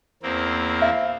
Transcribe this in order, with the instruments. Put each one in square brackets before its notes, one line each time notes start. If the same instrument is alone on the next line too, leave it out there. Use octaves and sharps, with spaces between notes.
[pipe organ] E2 A#3 C4
[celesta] E5 [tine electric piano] F5